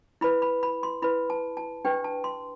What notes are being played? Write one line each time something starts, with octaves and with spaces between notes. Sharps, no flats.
E4 B4 B5
B5
B5
C6
E4 B4 B5
A5
A5
D4 G4 B4 G5
A5
C6